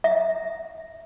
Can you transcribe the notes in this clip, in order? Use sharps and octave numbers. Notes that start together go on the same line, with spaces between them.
E5